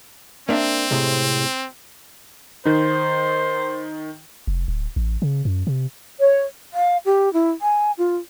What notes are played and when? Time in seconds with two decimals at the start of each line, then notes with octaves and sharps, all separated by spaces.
0.49 A#3 C4 D4 E5
0.91 A2 C3 G#3
2.65 D#3 D#4 C5
4.47 F1
4.68 D1
4.96 A1
5.22 C#3
5.45 F#2
5.67 C3
6.19 C#5
6.74 F5
7.05 G4
7.33 E4
7.61 G#5
7.98 F4